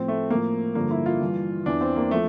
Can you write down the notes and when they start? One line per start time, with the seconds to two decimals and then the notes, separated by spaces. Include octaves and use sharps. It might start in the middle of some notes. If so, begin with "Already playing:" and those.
Already playing: A2 F3 C4
0.08 A3
0.31 A2 F3 A#3
0.75 G2 D3 F3 A#3
0.91 E4
1.06 F4
1.21 G2 E3
1.66 E2 E3 D4
1.81 C4
1.97 A#3
2.11 F3 A3